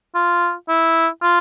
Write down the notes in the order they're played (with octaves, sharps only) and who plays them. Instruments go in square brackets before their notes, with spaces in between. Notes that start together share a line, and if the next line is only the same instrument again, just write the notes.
[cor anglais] F4
E4
F4